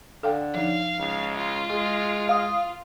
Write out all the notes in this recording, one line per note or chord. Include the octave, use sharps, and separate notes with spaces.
D3 A4 F5 G5
F3 D#4 F5
C#2
F4
G#3 G#4
F5 D#6